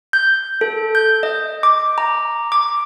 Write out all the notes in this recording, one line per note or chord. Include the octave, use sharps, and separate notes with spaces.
G6
A4
G6
D#5
D6
A#5
D6